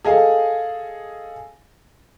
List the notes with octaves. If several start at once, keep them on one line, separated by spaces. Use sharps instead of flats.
G#4 A4 D#5 F5 G#5